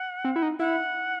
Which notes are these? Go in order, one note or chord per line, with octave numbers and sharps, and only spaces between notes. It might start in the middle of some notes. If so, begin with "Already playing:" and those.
Already playing: F#5
C4
E4
D#4
E4 F#5